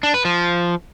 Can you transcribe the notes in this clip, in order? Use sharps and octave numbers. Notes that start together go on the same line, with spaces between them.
D4
B4
F3